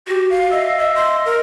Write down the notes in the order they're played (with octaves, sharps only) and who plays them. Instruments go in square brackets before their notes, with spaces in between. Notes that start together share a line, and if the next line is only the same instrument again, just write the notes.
[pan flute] F#4 [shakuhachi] G4
[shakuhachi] F5
[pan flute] D#5 [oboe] E5
[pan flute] D#5
[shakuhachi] C6
A#4